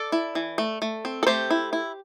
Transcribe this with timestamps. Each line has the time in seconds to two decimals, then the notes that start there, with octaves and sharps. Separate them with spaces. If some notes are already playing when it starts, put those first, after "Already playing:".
Already playing: A4 D5
0.12 E4
0.35 E3
0.58 A3
0.82 A3
1.05 C4
1.23 A4
1.27 A3 G4 C5
1.50 E4
1.73 E4